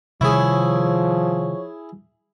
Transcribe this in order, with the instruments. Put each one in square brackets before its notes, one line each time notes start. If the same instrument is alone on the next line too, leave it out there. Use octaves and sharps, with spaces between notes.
[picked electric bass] C3 D#3 G3 [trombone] F3 [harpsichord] E4 G#4 [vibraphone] C#5 C#6